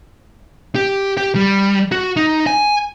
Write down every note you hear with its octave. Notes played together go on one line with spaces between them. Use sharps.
G4
G4
G3
F#4
D#4
G#5